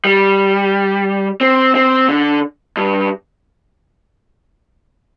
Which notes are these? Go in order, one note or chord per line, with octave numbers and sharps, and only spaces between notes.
G3
C4
C4
D3
G2